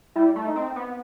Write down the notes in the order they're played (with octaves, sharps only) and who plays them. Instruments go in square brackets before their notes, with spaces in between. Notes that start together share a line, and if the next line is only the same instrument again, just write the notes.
[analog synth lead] G3 [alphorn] E4
[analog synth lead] A3
[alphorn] D#4
[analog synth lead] C4
B3